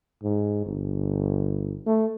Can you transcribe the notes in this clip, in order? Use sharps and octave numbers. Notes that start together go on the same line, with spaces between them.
G#2
G1
A3